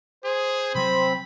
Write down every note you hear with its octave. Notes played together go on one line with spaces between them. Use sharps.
G#4 C5
C3 F#3 C4 B5